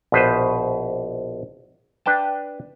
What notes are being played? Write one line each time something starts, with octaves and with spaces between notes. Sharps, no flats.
A#1 B2 B4 C5
D4 B4 G5 A5